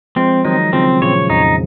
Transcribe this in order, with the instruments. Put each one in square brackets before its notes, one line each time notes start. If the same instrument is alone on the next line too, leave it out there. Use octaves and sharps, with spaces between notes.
[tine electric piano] F3 G#3 [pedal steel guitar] C4
[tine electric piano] D#3 F#3 [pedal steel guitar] D#4
[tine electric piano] C#3 F3 [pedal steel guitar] C4
[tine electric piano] A#2 C#3 [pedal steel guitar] C#5
[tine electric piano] F2 [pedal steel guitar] D#4